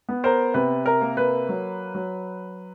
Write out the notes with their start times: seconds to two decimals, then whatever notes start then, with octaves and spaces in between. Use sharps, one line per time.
0.09 B3
0.24 A#4 C5
0.54 C3 B4
0.86 A#4
1.01 A#3
1.17 B4
1.49 F#3
1.95 F#3